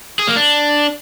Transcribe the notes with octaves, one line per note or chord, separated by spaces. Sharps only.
G#4
A#3
D4